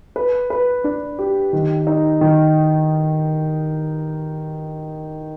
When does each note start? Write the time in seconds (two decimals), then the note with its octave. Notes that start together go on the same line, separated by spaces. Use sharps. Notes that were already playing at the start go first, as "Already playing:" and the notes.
0.16 B4
0.50 B4
0.84 D4
1.19 G4
1.53 D#3
1.87 D#4
2.21 D#3